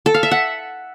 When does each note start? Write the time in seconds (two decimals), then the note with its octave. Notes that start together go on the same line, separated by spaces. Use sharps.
0.06 A4
0.14 F5
0.23 E5
0.31 F#5